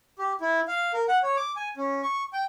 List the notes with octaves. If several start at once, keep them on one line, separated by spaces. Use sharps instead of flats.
G4
E4
F5
A#4
F#5
C#5
D6
G#5
C#4
C#6
G5